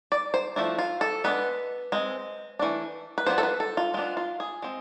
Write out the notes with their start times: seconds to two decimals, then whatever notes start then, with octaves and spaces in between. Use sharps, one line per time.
0.12 D5
0.34 C5
0.56 F3 A3 D4 E4
0.79 F4
1.01 A4
1.24 G#3 B3 D4 B4
1.92 G#3 C4
2.59 E3 A3 D4
3.18 B4
3.26 F3 B3 D4 C5
3.38 A4
3.43 B4
3.60 A4
3.77 F4
3.94 G#3 B3 D4 F4
4.17 F4
4.40 G#4
4.62 G#3 C4